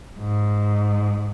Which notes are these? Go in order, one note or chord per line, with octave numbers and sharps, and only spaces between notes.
G#2